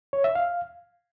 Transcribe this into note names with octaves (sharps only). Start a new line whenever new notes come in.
C#5
E5
F5